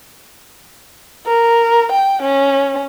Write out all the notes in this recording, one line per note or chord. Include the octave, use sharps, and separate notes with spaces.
A#4
G5
C#4